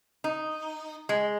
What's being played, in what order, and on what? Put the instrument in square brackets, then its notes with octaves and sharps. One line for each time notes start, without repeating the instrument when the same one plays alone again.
[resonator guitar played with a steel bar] D#4
G#3